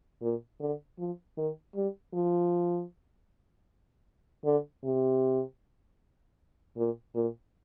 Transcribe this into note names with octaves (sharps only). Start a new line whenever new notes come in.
A#2
D3
F3
D#3
G3
F3
D3
C3
A#2
A#2